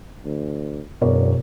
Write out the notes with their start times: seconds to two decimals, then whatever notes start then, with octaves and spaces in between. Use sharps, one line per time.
0.25 D2
1.02 E1 F#2 B2 A#4 C#5 D5